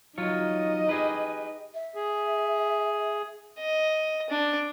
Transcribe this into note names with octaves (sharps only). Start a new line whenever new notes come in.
F#3 D#4 F4 C#5 D#5
G4 G#4 B4
E5
G#4
D#5
D4